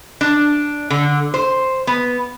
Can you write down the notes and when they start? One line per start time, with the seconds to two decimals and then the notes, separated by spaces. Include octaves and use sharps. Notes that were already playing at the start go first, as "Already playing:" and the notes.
0.21 D4
0.90 D3
1.34 C5
1.87 B3